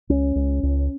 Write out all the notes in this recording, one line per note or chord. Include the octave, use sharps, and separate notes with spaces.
C#2 C#4
C#2
C#2